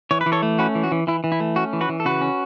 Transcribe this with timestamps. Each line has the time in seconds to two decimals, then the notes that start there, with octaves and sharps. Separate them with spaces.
0.11 E3 C#5
0.21 B4
0.26 E3
0.32 A4 C#5
0.42 A3
0.59 C#4 F#4 B4
0.75 E3
0.83 F#4
0.92 E3
1.07 E3 E4
1.24 E3
1.32 E4
1.40 A3
1.56 C#4 F#4
1.73 E3
1.81 F#4 B4
1.89 E3
2.00 A4
2.05 C#3 F#4 B4
2.21 C#4